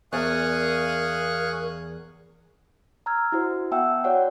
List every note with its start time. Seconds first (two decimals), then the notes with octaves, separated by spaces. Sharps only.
0.13 E2 A#4 D5 F5 G#5 C#6 D#6 F#6
3.06 A#5 E6 F6 G#6
3.32 E4 F#4 C5
3.71 B3 E5 F#5 G5 A5 E6
4.04 F#4 C#5 D5 F#5